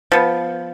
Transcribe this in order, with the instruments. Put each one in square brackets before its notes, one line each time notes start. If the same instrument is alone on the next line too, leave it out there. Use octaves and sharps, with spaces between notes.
[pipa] F3 B3